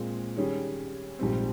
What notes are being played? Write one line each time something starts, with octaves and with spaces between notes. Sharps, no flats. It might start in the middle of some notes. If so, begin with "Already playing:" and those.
Already playing: A#2 G#3 C4
D#3 G3 C#4 G#4
A#1 G#2 G3 C4